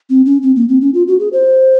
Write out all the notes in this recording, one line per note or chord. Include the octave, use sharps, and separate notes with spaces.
C4
C#4
C4
A#3
C4
C#4
F4
F#4
G#4
C5